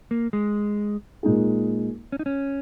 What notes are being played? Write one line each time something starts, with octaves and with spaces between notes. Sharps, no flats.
A#3
G#3
A#2 G#3 D#4 G#4
C#4
D#4
C#4